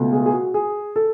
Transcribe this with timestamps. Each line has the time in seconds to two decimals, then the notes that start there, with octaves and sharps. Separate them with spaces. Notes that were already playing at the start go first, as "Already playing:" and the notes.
Already playing: C#2 B2 A3
0.12 G#4
0.26 G#4
0.33 F#4
0.54 G#4
0.96 A4